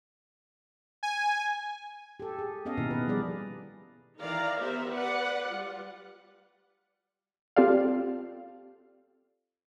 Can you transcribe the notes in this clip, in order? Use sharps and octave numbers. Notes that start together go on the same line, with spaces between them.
G#5
G4 A4
G#4
B3 C#4 A4 D#5 F5
B2 D#3 A#3 E4 G4 A#4
B3 B4
F3 G3 G#4 D5
D#3 E3 D5 F5 A#5
B3 G4 A#4 C5 E5
B4 D5 F#5
G3 F4
C4 F4 G4 A4 D5 F5